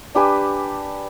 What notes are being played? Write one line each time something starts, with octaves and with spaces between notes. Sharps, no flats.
D4 G4 B4 G#5